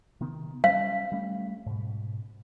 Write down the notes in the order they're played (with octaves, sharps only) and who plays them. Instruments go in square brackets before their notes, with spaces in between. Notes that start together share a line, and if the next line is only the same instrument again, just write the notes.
[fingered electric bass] C3 D#3 B3
[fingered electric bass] G3 C#4 [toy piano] F5
[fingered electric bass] G3 A3 C#4
G#2 B2